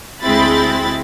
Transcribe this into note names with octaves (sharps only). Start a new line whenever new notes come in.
D2 G#3 C4 E4 B5 A6